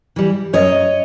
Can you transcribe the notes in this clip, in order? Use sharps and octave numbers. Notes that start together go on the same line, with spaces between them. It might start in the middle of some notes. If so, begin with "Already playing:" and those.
E3 G3
F#2 C#5 D#5